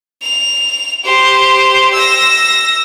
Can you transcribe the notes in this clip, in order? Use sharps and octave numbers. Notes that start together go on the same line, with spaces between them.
F7
G4 C5
E6 A#6